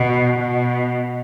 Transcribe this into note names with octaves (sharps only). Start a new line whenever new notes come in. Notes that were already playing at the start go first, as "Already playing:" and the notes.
Already playing: B2
B2